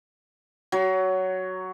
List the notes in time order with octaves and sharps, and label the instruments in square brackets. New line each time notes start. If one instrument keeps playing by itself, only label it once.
[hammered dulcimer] F#3